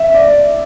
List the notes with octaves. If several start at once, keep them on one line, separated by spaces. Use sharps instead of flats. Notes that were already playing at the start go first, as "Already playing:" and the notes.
Already playing: E5
D5